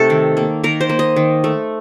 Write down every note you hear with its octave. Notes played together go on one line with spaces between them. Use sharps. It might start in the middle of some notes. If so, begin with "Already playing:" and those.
Already playing: C3 A3 D#4 A4
D#3
A#3
D#3 A#4
C5
A#3
D#5
D#3
A3